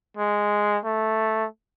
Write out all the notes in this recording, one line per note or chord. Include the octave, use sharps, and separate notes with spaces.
G#3
A3